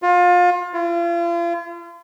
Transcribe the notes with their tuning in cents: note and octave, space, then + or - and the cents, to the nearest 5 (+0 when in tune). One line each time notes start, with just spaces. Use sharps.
F4 +30
F4 -40